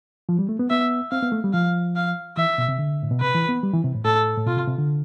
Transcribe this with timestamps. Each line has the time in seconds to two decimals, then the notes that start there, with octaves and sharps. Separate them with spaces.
0.29 F3
0.39 G3
0.49 A3
0.59 B3
0.70 B3 E5
1.11 C4 F5
1.23 B3
1.32 A3
1.44 G3
1.53 F3 F5
1.96 F5
2.37 E3 E5
2.58 B2
2.69 C3
2.79 D3
3.03 A2
3.11 B2
3.21 C3 B4
3.35 E3
3.49 B3
3.63 G3
3.73 E3
3.84 C3
3.94 A2
4.05 A2 A4
4.37 A2
4.47 B2 F4
4.57 C3
4.67 C3
4.78 D3